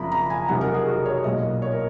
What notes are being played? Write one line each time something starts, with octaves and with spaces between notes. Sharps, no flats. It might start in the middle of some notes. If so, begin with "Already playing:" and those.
Already playing: F#1 F2 F3 A#5 B5
A#5
G#5
F1 F2 D#3 F#3 F#5
A#4
G#4
F#4
C#5
B1 A#2 F#3 A#3 D#5
C#5
A#4